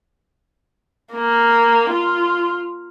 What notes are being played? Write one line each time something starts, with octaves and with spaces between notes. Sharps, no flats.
A#3
F4